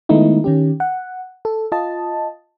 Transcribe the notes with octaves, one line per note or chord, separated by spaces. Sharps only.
D#3 G#3 A3 B3 D#4 E4
D#3 C#4 G4
F#5
A4
F4 D#5 A5